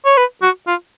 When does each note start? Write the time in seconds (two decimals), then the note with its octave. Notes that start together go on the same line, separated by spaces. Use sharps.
0.05 C#5
0.17 B4
0.42 F#4
0.67 F4